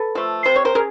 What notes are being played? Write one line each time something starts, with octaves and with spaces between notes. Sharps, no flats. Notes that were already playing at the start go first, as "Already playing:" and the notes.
Already playing: A4 B4
F3 A3
C3 C5
C#5
A#4 C5
C#4 G#4 A#4